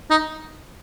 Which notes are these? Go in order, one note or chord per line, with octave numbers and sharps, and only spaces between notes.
D#4